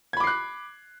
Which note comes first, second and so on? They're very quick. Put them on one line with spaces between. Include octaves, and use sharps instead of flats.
G#6 B5 D6 C7 F#6